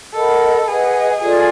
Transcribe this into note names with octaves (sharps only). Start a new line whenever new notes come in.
A4 A#4 D#5 F#5 B5
G#4 B4 D#5 F#5
F4 G#4 A4 D5